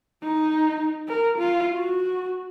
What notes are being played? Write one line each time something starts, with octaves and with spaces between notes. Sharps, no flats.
D#4
A#4
F4
F#4